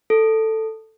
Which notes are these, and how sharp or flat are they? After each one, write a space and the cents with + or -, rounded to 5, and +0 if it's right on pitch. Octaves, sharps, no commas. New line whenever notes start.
A4 +5